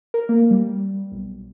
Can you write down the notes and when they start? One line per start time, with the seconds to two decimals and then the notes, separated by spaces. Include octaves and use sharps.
0.14 A#4
0.29 A#3
0.51 G3
1.12 B1